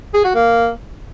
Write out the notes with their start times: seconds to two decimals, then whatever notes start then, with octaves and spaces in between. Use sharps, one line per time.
0.14 G#4
0.24 F#4
0.35 A#3